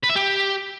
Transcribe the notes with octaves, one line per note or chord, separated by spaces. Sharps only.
B4
E5
G4